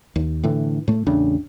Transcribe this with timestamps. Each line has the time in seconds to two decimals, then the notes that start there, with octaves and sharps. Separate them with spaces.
0.16 D#2
0.44 A2 D3 E3
0.88 A2 A3
1.06 A1 E2 C#3 D4